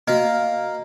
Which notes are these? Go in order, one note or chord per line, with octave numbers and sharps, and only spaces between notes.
A#3 F#4 D#5